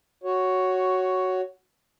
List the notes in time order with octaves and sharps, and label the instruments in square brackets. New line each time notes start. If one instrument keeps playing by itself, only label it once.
[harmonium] F#4 C#5